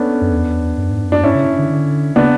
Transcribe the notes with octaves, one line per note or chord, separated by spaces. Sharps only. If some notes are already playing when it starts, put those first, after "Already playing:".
Already playing: A3 B3 C#4 D4
F#2
E2
F#2
G#2
F#2
D4
G#2 C#4 E4
C#3
D3
D3
C#3 B3 D4